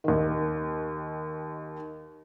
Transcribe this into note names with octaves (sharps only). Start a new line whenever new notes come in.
D#2 D#3